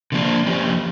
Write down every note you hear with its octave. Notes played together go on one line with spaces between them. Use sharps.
D3 F3 A#3 D4
F3 C#4 G4